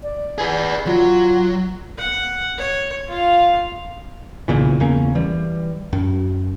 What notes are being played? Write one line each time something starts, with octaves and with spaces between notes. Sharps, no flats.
D5
G#4 B4
F#3 F4
F#5
C#5
F4 F5
B1 A#2 C#3 E3
E2 C#3 A#3 C#4
E3 G3
F#2